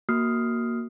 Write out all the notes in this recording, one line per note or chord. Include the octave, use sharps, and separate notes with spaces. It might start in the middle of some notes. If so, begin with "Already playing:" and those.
A#3 F#4 D#6 F6 C7